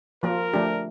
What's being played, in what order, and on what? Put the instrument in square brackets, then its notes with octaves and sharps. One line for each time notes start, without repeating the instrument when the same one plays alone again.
[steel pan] F3 A#3 F4 [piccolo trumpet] A#4
[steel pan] F3 A3 D4 G4